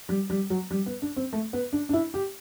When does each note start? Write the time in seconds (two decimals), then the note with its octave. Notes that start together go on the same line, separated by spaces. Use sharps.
0.09 G3
0.30 G3
0.50 F#3
0.71 G3
0.86 B3
1.02 D4
1.17 C4
1.33 A3
1.53 B3
1.73 D4
1.89 D4
1.93 E4
2.14 G4